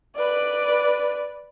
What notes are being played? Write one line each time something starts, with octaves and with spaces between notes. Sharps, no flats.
B4 D5